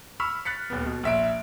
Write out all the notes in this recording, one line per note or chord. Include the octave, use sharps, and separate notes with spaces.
B5 C#6 E6 F6 B6
F#6 A6 B6 C#7
D#1 B3
B2
A#1 E5 D7